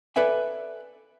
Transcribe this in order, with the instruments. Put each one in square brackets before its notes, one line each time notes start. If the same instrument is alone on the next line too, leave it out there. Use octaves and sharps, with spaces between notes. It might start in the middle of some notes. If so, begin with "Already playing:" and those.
[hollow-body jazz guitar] A4 B4 D5 E5 G#5